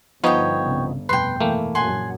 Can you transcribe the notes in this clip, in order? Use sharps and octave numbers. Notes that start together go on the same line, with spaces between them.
G1 F3 B3 D#4 C#5 G5
C2 C#3
F1 G2 B2 B4 G5 C6
E3 A3 A#3
A#1 F#2 F#5 G#5 C6